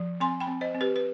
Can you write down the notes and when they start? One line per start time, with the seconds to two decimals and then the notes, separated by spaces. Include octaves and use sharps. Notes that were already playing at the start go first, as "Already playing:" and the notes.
Already playing: F3
0.20 C4 G#5 C6
0.40 G5 B5
0.47 C4
0.61 C5 D#5
0.75 C4
0.81 G4 B4
0.96 B4